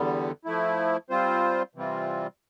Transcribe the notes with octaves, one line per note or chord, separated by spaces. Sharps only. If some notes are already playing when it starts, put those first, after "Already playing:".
Already playing: E2 D3 G3 B3
F3 A3 E4
G3 C4 F4 C5
C3 E3 G3 C4 F4